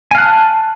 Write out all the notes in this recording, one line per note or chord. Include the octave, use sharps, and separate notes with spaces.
F5 G#5 A5 F#6